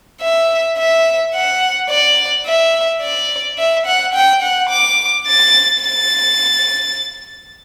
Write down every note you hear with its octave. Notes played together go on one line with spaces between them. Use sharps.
E5
E5
F#5
D5
E5
D5
E5
F#5
G5
F#5
D6
A6
A6